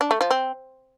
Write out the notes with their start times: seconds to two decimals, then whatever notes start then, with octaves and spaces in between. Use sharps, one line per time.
0.01 D4
0.11 A3
0.21 F3
0.31 C4